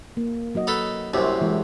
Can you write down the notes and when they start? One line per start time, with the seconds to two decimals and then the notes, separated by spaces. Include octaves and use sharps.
0.17 A#3
0.55 F#3 F#4 D#5
0.67 D#4 A4 B4
1.14 C2 F#2 C3 E4 F#4 C5
1.41 E3 G#3